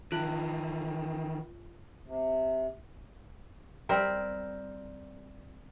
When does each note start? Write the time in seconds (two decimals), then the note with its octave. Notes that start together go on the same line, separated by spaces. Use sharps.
0.12 D#3 E3 F4
2.06 C3
3.89 G3 C4 A#4